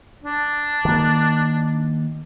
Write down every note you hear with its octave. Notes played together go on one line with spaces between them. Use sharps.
D4
D#3 A#3